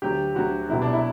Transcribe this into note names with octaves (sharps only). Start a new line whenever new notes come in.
D2 D3 F#3 G4
D2 D3 F#3 F#4
C2 B2 F#3 E4
D4
E4